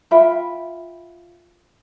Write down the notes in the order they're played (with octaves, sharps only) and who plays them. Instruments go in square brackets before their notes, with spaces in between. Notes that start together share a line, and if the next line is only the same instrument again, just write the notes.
[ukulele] F4 E5 G5 B5